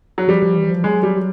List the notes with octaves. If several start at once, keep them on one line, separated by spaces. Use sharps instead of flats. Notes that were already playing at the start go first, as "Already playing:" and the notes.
F#3
F3 G3
F3
E3
F3
F#3 G#3
G3